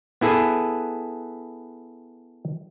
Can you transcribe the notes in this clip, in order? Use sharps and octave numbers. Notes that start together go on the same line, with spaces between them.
B3 E4 G#4 A4 B4